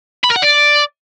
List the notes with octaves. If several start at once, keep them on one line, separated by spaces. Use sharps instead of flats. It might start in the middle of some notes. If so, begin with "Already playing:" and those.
B5
A#4
F#5
D5